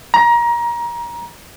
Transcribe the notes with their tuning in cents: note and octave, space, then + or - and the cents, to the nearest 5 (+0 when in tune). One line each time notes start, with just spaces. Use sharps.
A#5 +25